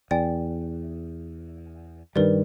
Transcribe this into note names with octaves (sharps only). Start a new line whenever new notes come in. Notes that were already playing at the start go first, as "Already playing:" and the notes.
E2 D5 G5 G#5
G2 D#3 G3 A#4 B4 D5